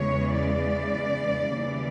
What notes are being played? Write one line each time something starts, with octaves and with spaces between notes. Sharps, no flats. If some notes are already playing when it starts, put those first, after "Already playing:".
Already playing: E2 C#3 E3 G#3 C#5
D5
D#2 C#3 E3 G3